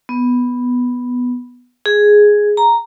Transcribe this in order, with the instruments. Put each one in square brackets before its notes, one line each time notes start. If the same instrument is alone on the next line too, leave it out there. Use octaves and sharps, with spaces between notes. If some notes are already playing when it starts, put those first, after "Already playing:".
[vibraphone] B3
G#4
A#5